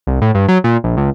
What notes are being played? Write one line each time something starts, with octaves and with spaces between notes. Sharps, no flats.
C2
A2
G2
F#3
A#2
A#1
C#2